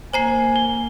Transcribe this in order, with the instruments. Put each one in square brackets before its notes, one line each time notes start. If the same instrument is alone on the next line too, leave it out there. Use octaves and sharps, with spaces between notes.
[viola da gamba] A#3 [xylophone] C5 A#5 C7 [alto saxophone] G#5
[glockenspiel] G7